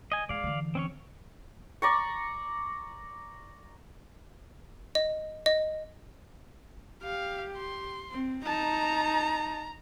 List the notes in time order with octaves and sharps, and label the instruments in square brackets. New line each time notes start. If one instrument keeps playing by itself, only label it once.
[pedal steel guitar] D#5 G#5
[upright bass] G#2 [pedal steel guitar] D5 F5
[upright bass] D3 E3
[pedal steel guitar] C4 C#4 C#5
[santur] D5 A#5 C#6
[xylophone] D#5
D#5
[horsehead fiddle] G4 [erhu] F5
[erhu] C6
[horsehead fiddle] C4
[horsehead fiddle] D#4 A5 [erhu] A#5